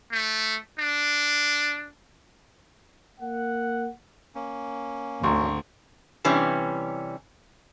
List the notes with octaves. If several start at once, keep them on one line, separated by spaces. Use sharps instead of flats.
A3
D4
A#3 F#5
A#3 C#4
G#1 D2 A#5 C6 C#6
C3 E3 G3 C#4